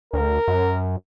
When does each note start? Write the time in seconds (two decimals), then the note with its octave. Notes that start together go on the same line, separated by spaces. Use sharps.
0.13 D2 A#4
0.48 F#2